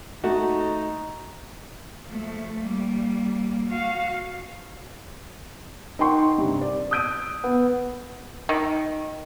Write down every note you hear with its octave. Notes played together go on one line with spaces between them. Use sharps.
A3 D#4 F#4
F3 A3
G3 A#3
F#4 F5
D#4 A#4 F#5 G5 C6 C#6
G2 C3
D5
D#6 E6 G6 D7 D#7
B3
D#3